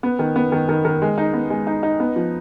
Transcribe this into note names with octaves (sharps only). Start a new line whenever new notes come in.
B3
D#3
B3
D#3
D#3
D#3
G#3
D#4
B3
G#3
D#4
D#4
B3
F3